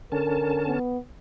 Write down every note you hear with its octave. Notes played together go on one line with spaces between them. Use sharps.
D3 C#4 A#4 A5
B3